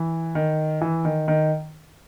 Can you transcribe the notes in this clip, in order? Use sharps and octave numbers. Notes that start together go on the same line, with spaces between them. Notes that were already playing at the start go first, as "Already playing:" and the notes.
Already playing: E3
D#3
E3
D#3
D#3